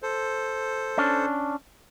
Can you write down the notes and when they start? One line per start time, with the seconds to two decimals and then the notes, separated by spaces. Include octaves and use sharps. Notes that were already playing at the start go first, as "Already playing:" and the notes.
0.03 A4 C5
0.97 C#4 D4